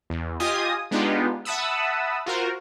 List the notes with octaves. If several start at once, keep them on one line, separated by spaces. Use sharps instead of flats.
E2
F4 G4 D#5 G#5 D#6
G#3 B3 D4 D#4 F4 G4
E5 F#5 A5 B5 D#6 E6
F4 F#4 A#4 C5